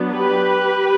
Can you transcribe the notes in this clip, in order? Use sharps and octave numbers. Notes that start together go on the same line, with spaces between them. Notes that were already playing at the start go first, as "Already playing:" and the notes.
Already playing: F#3 B3 D4
G4 B4